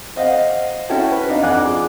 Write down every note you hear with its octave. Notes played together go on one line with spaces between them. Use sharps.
C5 D#5 F5 F#5
C#4 E4 F#4 G5 A5
B4
D4 D#4 D5 D#5 F5
F2 D4 F#5 G#5 D6 F#6
F4 G#4 D6